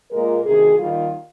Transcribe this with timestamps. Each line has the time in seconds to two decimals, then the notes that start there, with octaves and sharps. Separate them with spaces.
0.11 A#2 G#3 A#4
0.45 D2 C3 D#3 G#4
0.79 D#2 D#3 G3 F4